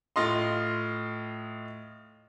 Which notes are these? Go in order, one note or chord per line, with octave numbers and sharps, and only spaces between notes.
A2 F4 D#5 C6